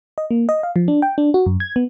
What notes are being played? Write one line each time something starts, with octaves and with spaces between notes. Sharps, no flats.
D#5
A#3
D#5
F5
F3
D4
G5
D4
F#4
F#2
G#6
B3